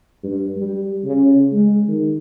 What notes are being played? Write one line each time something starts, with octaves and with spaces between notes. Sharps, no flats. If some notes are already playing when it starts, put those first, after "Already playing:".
G2
G3
C#3
G#3
D#3